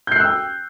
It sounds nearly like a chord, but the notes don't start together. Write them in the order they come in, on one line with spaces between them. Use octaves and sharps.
G6 C7 F#6 E6 G5